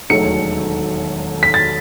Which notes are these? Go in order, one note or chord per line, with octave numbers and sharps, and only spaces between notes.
E1 D#2 D#3 F#3 A3 C#7
B6
A6